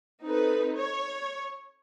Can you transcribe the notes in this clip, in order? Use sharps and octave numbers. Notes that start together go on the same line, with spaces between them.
C4 D#4 A4 B4
C#5